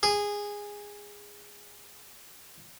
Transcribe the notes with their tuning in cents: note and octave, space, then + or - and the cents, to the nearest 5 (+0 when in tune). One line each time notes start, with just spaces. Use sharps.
G#4 -15